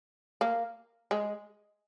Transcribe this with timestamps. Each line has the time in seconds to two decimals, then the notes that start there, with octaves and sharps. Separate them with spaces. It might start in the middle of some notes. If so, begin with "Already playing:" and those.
0.41 A#3
1.11 G#3